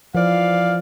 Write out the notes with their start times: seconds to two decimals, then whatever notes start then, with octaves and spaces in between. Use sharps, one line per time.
0.15 E3 F3 D5 F5